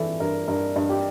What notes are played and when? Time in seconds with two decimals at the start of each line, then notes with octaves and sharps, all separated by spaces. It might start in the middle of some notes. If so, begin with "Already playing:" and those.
Already playing: G2 E3 A4
0.20 G2 A#4
0.48 G2 A#4
0.76 G2
0.89 G4